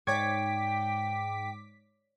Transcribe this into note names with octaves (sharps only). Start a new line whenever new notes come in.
G#2 C#5 D5 G5 D6 G#6 B6